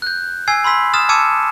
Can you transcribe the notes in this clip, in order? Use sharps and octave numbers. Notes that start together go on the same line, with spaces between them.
F#6 G6
G#5 E6 G#6 C7
B5 C6 E6 B6
D#6 F6 A6 E7
A5 D6 E6 G#6 C#7 D#7